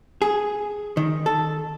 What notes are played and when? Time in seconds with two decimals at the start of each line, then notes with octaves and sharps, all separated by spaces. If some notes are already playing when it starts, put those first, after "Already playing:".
0.22 G#4
0.97 D#3
1.26 A4